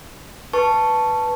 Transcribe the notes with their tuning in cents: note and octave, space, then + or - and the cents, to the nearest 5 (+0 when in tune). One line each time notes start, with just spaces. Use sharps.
B4 -5 A5 +0 C#6 +0